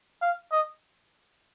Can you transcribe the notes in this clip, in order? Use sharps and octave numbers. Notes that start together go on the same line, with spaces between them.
F5
D#5